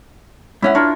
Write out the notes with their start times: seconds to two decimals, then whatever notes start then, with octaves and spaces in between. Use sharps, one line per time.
0.62 G#2 C#4 E4 F#5
0.75 D4 F4 A#4 C#5